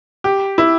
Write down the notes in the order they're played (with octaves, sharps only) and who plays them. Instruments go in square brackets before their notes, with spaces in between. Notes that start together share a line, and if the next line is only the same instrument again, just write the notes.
[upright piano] G4
E4